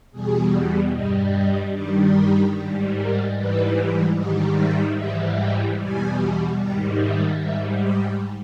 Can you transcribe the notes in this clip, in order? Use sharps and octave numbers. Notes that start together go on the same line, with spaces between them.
E2 B2 G3 G#4
G2 G3 D#5
D#5
G2 D#3 G3 G4
G4
G#2 G3
A#4
G#2 E3 G3 B4
G#2 D#3 G3 D#5
E5
G#2 E3 G3 E5
G5
E2 B2 G3 G#5
G#2 D#3 G3 G5
E5
G#2 G3 E5
G5